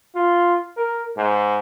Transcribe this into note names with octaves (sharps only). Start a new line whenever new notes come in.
F4
A#4
G#2